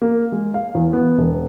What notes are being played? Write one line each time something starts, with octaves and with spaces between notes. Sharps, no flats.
A#3
G#3
F5
E2
B3
E1